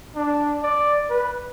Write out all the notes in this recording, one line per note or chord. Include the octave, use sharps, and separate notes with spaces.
D4
D5
B4